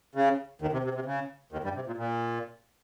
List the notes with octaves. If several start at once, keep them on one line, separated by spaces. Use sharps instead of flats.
C#3
D#2 D#3
C3
C3
C3
C#3
D#2 D#3
G2 G3
C3
A#2
A#2